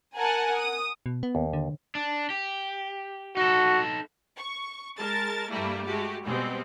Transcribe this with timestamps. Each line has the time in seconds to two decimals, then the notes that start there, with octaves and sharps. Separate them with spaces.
0.18 A#4 F#5 G#5 A5
0.57 D#6
1.06 B2
1.23 B3
1.35 D#2
1.53 D3
1.95 D4
2.30 G4
3.37 D#4 F#4 A4
4.36 C#6
4.98 G#3 A#4 A5 A6
5.50 G2 G3 A3 A#3 E4
5.85 G#3 A3 F#4 G4
6.24 B2 G3 G#3 C4